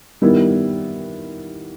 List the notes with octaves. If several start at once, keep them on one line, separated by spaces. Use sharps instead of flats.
D#3 G3 B3 E4